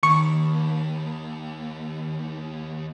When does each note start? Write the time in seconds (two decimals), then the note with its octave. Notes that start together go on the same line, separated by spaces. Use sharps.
0.03 D#2 D#3 A#3 A5 B5 C#6